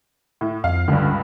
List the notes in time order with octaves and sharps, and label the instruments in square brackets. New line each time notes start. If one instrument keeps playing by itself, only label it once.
[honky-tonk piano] A2
[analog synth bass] F2 [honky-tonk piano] F5
[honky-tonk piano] C#2 G2 [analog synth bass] D3